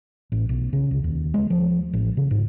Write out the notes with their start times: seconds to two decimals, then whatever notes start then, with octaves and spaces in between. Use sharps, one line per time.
0.32 A1
0.49 B1
0.73 C#3
0.91 C#2
1.04 D#2
1.34 G#3
1.50 F3
1.93 A1
2.17 C#3
2.31 G#2